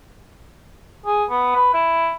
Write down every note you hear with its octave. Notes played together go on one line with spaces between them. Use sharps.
G#4
B3
B4
E4